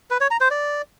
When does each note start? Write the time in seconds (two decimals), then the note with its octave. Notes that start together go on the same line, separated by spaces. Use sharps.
0.11 B4
0.21 C#5
0.31 A#5
0.41 C5
0.51 D5